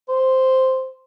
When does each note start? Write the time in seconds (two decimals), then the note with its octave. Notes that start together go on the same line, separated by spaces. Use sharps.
0.08 C5